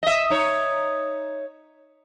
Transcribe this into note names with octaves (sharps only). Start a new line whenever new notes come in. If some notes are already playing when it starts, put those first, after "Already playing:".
D#5 E5
D#4 C#5